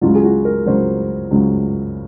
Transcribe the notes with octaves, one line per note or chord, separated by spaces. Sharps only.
C#2 C#3 F#3 F4
G#4
F#4
A#4
C#2 C#3 F#3 C5
C#2 C#3 F#3